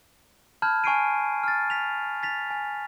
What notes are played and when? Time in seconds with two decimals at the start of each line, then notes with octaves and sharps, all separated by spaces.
0.62 A5 B5 F6 G6 G#6
0.84 G#5 C#6 F6 C7 D7 D#7
1.43 F6 A6
1.70 B6 F7
2.23 A6 B6 F7
2.51 G#5